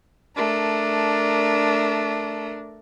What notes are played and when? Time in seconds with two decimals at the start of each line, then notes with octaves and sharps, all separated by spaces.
0.36 A3 D4 A#4